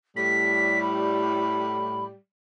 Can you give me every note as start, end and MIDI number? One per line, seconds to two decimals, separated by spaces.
0.16 2.13 45
0.16 2.13 55
0.16 0.81 95
0.82 2.04 83